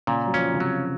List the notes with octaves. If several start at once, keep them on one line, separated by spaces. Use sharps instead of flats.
A#2 C#3
F#3
F3 C#4
C#3
C3 F#3